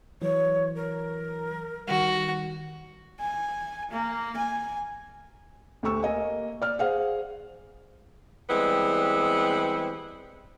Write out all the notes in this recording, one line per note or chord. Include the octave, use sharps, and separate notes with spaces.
E3 F#3 C#5
A#4
D#3 G3 F#4
G#5
A#3
G#5
D2 G4 A4 C#6 E6
A#3 D#5 G#5
D5 F6
G#4 C5 F5 F#5
E3 G3 G#3 B3 C4